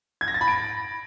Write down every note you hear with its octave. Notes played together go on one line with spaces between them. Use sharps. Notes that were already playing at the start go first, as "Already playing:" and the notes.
G#6
A#6
A6
B5
D7